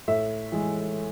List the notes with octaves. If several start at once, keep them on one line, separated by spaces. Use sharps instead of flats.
A2 E5
E3 G#3